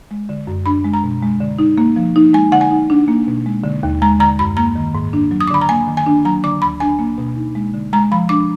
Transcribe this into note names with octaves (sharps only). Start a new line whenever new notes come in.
G#3
D3
F#2
D4 B5
G#3
A#5
B2
G#3
D3
D#4
A#3
F3
D#4
G#3 G#5
D3 F#5
G#5
D#4
D4
A#3
B2
G#3
D3
D#2
G#3 A#5
D3 A#5
F#2 B5
A#3 A#5
D#3
G#2
D4
F#3
D#6
D6
D3 B5
A#5
A#3 G#5
D#3
G#5
D4
F#3 A#5
D3 D6
D2 B5
D4 G#5
A#3
B2
D#4
G#3
D3
G#3 A#5
F3 B5
D4 D6